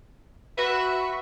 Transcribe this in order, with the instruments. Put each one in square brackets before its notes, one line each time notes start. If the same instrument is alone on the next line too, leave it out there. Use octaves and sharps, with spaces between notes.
[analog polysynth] F#4 E5 [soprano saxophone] B4